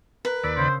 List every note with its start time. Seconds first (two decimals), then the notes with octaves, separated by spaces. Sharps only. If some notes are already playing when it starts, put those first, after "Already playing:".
0.25 A#4 B4
0.43 D#2 D5 B5 E6 B6 D7
0.57 C#3 C5